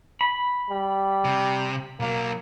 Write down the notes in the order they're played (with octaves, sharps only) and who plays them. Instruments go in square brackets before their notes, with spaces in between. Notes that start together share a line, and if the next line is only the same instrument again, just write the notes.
[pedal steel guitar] B5
[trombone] G3
[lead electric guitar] C3
[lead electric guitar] B1 F#3 [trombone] A#3